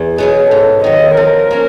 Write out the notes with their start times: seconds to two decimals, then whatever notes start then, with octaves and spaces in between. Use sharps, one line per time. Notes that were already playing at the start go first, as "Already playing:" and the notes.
Already playing: E2 E3
0.18 B2 F#3 B3 G#4
0.51 G#2 A4
0.84 D#3 F#3 D#5
1.17 F3 A#4
1.51 A#3 C#4